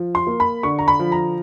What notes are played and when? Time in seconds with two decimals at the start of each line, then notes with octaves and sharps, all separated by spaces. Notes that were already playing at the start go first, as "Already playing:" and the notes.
Already playing: F3
0.15 C6
0.27 A#3
0.40 B5
0.63 D3 C#6
0.79 A#5
0.88 B5
0.99 F3
1.12 A#5